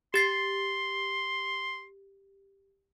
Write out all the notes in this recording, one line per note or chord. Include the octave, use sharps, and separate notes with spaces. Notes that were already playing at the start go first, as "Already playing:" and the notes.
G4 C6 A6 C7